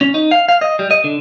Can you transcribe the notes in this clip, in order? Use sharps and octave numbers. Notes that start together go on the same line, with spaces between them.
C#4
D#4
F5
F5
D#5
G3
D#5
D3